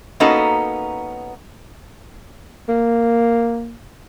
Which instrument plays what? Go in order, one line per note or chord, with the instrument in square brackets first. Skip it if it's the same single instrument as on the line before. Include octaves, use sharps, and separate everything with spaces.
[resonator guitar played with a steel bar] A#3 B3 C#4 D#4 F#4 A4
[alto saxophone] A#3